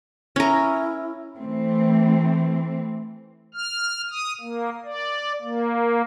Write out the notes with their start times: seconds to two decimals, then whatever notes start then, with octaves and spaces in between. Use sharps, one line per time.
0.36 C#4 E4 A#4
1.38 E3 A3 C4
3.54 F6
4.10 D#6
4.41 A#3
4.85 D5
5.42 A#3